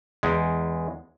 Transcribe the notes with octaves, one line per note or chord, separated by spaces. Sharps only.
E2 G#3